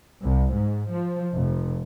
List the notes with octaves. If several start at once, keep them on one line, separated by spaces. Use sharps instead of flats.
C2
G#2
F3
F1